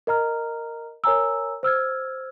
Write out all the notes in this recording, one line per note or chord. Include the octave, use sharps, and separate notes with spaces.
A#4 D#5 A#5 F6
A#4 C#5 G#5 A#5 E6
C5 E6 F6 G#6